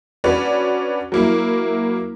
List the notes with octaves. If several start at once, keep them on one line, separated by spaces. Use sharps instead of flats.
C#4 D4 F#4 B4 D5
F#3 A#3 E4